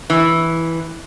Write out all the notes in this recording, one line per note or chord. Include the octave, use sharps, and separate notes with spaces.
E3